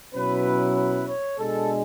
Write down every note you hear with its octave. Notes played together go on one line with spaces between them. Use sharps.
B2 F#3 C#4 E4 B4
B4
C#5
B2 G#3 D4 A4